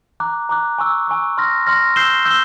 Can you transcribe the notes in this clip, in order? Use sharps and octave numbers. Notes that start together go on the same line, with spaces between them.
A#5 D6 F#6
A#5 D6 F#6
G#5 C#6 E6
G#5 C#6 E6
C6 F6 A#6
C6 F6 A#6
E6 G6 C7 E7 G7
E6 G6 C7 E7 G7